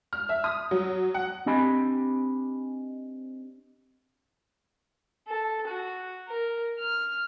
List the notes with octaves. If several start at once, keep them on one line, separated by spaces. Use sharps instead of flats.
F6
E5
D#6
F#3
F#5
C4 D4 G4 D#5 G#5 B5
A4
F#4
A#4
F6